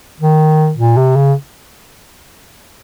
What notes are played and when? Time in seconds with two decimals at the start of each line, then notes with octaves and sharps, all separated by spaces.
0.20 D#3
0.78 A#2
0.97 C3
1.16 C#3